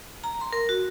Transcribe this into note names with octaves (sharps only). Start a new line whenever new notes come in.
A#5
C6
A#4
F#4